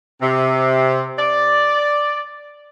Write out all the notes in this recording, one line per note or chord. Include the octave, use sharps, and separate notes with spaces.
C3
D5